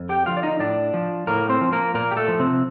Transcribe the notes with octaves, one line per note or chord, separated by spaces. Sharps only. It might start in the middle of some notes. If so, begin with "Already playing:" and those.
Already playing: F2
G4 G5
D3 F3 F4 F5
D5
D#4 D#5
A2 D4 D5
F3
A2 A#3 A#4
C4 C5
F3
A#3 A#4
A#2 A#3 A#4
G4
A3 A4
F3
C3 C4